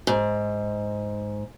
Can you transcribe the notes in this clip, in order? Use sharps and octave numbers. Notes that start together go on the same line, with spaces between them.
G#2